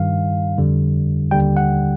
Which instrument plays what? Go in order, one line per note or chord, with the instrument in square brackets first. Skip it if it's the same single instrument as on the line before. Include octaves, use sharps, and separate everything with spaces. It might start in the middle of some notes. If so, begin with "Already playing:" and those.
Already playing: [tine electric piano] G2 D#3 G3 F5
F2 D3 G3
D#2 D3 G3 G5
F#5